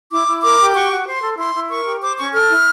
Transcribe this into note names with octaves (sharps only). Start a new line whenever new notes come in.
E4 D6
E4
A#4 D6
G4
F#4 C#6
F#4
C5 C6
A4
E4 C6
E4
A#4 C#6
G4
C5 D6
C#4 C#6
A4 F6
E4